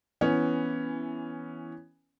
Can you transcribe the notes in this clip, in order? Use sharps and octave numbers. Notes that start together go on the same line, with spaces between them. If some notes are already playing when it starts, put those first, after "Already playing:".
E3 B3 C#4